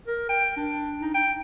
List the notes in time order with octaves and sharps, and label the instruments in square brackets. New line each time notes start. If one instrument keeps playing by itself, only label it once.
[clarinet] A#4
G5
D4
D#4
G5